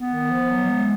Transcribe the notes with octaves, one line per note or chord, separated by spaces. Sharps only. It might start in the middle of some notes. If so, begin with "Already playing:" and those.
Already playing: B3
D#3
F3
F#3
G#3